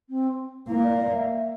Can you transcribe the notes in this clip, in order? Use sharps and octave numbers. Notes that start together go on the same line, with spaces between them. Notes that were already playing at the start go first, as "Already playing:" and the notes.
C4
A#3 E4
D5
D5
E5